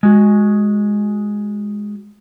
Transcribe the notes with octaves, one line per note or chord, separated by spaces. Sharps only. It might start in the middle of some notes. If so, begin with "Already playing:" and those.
G#3 F#4